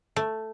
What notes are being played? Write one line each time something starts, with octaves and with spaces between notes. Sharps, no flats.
A3